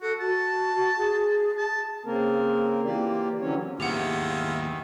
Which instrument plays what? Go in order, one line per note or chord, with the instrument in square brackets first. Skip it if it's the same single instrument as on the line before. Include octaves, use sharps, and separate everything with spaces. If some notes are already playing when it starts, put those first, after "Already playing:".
[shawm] F#4 [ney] A4
[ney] F#4 [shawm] A5
[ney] G#4
[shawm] A5
[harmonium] C#3 A#3 C4 A#4
E3 A#3 F4 G4 D5
D3 E3 F#3 C4 C#4 C#5
[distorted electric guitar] D#2 B3 [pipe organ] D#3 [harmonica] E4 F4 G#4 [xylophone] G4 F#5